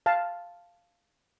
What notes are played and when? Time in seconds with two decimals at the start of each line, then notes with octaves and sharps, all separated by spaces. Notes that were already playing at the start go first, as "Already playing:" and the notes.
0.06 F5 A5